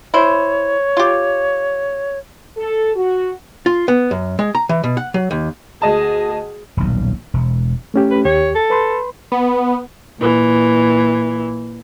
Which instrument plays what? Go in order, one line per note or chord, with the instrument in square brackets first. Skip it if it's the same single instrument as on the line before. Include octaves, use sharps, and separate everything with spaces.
[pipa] E4 C5 [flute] C#5
[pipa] F4 G4
[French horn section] A4
F#4
[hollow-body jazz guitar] F4
B3
F#2
G#3
A#5
E3
B2
F#5
F#3
D#2
[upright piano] D2 D#5 A5 [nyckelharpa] G#4
[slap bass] D#1 B1
E1
[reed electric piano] A3 C#4 G4
[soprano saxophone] B4
[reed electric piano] D#2 G4 [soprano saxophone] C#5
[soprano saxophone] A4
[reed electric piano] B4 B5 C6
[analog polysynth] B3
[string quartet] A#2 E3